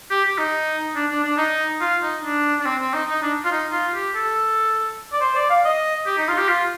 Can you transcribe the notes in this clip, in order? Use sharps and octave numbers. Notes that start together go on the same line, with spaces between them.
G4
G4
D#4
D4
D4
D4
D#4
F4
D#4
D4
D4
C4
C4
D#4
D#4
D4
F4
D#4
F4
G4
A4
D5
C5
D5
F5
D#5
G4
D#4
F4
G4
F4